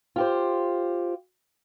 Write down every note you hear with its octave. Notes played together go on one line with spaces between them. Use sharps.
F4 G4 C5